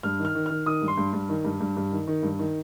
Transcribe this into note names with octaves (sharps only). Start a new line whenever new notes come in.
G2 F6
D#3
F6
D#3
D#3 F6
D#3 D#6
G2
C6
G2
G2
D#3
G2
G2
G2
D#3
D#3
G2
D#3